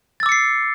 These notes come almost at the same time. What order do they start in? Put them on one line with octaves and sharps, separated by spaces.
A6 E6 D6 C#7 C7